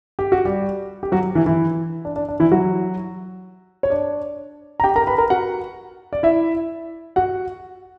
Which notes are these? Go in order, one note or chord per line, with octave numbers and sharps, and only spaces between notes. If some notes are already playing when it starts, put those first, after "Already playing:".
G4
F#4
G3 G4
G4
F#3 F#4
E3 E4
E3 E4
D4
D4
D4
E3 E4
F#3 F#4
C#5
D4 D5
A#5
G4 G5
A#4 A#5
B4 B5
A#4 A#5
F#4 F#5
D5
E4 E5
F#4 F#5